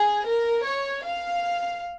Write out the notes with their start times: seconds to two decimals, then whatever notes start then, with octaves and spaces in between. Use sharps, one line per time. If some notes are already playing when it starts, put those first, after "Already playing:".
Already playing: G#4
0.26 A#4
0.65 C#5
1.05 F5